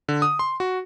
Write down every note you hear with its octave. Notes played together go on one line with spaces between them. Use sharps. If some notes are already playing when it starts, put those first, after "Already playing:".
D3
D#6
C6
F#4